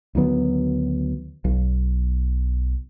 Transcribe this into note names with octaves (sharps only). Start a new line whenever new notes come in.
D2 D#3 F#3 B3
B1